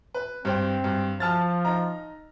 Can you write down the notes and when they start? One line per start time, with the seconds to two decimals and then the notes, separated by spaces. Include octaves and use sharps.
0.15 B4
0.45 G2 C4 C5 G5
0.84 G2
1.20 F3 A5 F6 A6
1.65 D#4 A#5